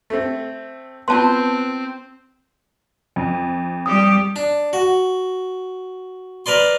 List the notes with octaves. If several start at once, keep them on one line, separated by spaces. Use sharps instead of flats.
A3 C4
B3 C4 F4 A5 C6
F2
G3 G4 D#6
D4
F#4
A#4 B4 D5 C6